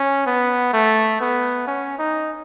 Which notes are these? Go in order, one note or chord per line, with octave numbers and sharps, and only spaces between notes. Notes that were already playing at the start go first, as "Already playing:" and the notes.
Already playing: C#4
B3
A3
B3
C#4
D#4